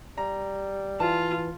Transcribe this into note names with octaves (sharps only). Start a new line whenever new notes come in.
G3 A#5
E3 F4 A5